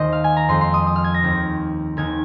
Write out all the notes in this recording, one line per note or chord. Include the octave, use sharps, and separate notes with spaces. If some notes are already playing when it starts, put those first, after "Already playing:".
Already playing: D#2 D#3 G#3 F4 C5 D#5
F5
G#5
A#5
F2 F3 G#3 C4 C6
C6
D#6
D#6
F6
G#6
A#6
D#2 D#3 C4
D#2 D#3 G#3 D#4 G#6